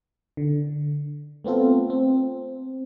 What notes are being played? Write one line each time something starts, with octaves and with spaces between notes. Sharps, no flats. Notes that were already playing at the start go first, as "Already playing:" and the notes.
D3
A3 B3 C4 F4 A4
C4